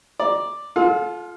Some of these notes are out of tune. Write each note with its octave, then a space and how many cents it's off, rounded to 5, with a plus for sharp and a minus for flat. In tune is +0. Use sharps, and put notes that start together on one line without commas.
D5 +0 A#5 +20
F4 +0 A4 -35 F5 +45